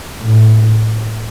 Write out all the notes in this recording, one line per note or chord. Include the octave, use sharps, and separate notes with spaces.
A2